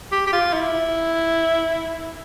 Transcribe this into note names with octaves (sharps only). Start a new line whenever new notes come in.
G4
G4
F4
E4